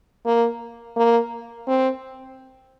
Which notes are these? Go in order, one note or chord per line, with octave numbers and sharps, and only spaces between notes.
A#3
A#3
C4